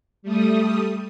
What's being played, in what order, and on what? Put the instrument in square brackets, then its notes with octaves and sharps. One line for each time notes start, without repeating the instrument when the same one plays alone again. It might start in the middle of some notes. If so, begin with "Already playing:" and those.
[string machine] G3 A3 D#6